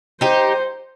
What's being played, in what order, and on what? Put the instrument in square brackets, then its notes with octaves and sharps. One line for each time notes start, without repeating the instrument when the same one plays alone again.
[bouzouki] D#4 G4 [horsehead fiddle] C5